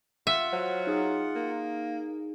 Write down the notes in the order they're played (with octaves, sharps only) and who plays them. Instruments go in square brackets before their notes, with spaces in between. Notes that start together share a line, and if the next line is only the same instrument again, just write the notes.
[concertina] F4 F#5 [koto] E5
[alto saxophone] F#3 [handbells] C5
[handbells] D#4 G#4
[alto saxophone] A#3